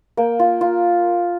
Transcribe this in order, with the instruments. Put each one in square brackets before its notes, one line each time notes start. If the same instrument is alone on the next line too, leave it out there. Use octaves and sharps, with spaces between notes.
[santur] A#3 G5
F4
F4